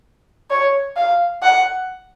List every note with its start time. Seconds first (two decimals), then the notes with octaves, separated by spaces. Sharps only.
0.50 C#5
0.96 F5
1.42 F#5